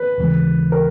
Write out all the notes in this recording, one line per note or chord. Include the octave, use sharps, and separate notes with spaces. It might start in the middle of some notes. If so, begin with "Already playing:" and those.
Already playing: B4
D#2 C#3 E3 G#3
A#4